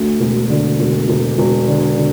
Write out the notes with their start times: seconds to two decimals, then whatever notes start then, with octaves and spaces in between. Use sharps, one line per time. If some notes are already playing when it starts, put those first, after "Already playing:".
Already playing: D2
0.20 E1
0.49 D3
0.80 E1
1.09 E1
1.38 E1
1.67 D3
1.96 D3